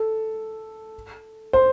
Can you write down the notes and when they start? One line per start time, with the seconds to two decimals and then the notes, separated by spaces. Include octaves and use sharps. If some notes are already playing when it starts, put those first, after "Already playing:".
Already playing: A4
1.53 C5